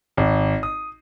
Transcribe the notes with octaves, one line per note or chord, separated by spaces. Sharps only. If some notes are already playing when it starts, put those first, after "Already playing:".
G#1
D#6